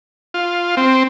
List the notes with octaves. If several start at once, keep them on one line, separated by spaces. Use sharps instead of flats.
F4
C4